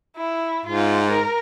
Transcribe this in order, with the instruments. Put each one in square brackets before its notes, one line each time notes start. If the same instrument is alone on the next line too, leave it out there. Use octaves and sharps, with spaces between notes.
[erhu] E4
[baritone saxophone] G#2 [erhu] F4
[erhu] A#4